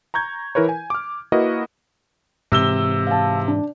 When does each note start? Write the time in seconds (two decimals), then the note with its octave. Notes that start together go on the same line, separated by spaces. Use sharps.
0.14 A#5 C#6 G6 G#6
0.55 E3 E4 A#4 B4 C#5
0.69 G#5
0.90 D6 F6
1.32 A#3 E4 F#4 A#4 B4 D#5
2.52 G#2 C3 E3 E6 G7
3.07 F5 A5
3.48 D4